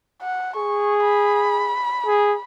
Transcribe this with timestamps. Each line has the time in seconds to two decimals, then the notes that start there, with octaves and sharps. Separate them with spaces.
0.22 F#5
0.56 G#4 C#6
1.04 B5
2.06 G#4